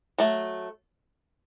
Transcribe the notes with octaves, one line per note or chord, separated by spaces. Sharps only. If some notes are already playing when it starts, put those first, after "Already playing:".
F#3 A3